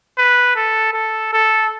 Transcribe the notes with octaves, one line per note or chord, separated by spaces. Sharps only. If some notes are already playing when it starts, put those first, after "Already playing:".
B4
A4
A4
A4